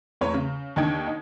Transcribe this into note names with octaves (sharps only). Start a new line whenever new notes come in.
E2 A3 B4 C#5
C#3
D#2 D3 D#4 G5 G#6
D#4